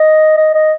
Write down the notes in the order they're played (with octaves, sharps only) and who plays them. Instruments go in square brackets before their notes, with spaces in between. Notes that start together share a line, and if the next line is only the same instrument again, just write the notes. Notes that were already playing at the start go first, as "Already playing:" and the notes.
Already playing: [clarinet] D#5
D#5
D#5